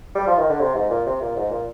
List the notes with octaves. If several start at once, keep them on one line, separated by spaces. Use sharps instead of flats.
G3
F3
D#3
D3
C3
G#2
A#2
C3
A#2
G#2
A#2